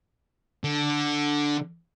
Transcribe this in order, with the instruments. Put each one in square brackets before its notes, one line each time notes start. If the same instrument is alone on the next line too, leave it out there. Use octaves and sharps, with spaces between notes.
[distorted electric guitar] D3